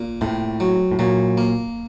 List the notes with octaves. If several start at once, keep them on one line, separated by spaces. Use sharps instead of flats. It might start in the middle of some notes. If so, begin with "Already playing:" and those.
Already playing: A#2
A2 C3
F#3
A2
A#2 F#3
A#3